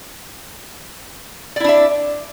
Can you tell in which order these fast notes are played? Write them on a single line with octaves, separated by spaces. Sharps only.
D5 E4 D4 E5